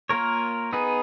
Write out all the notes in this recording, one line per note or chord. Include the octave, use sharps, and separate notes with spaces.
A#3 F4 A#4 C#5
B3 D#4 G#4 B4